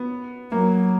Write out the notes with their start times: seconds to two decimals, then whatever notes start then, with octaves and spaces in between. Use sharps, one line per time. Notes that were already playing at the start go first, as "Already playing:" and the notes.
Already playing: B3
0.52 F#3 A#3